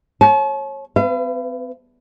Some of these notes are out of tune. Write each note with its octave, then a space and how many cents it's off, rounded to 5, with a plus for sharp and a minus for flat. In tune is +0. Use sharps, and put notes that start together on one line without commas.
C#5 -25 A5 -45
C4 -40 B4 +20 F5 -45